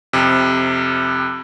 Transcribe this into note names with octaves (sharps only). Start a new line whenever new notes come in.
F2 C3